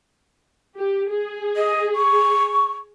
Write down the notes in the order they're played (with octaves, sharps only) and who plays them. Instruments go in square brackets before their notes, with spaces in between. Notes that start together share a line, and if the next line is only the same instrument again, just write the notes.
[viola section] G4
G#4
[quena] D#5
C#6